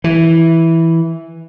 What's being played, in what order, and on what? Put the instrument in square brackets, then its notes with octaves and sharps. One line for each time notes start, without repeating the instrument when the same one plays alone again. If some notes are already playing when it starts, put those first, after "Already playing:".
[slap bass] E3